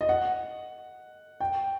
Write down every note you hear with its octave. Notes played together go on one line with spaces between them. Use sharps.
D#5
F#5
G5